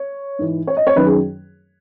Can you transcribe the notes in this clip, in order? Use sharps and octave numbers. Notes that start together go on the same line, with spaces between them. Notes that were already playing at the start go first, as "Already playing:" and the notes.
Already playing: C#5
G#2 E3
C#5
D#5
C#5
F#2 D#3 B4
G#4